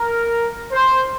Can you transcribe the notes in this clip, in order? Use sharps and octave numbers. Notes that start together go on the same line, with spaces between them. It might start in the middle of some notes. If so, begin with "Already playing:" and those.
Already playing: A#4
C5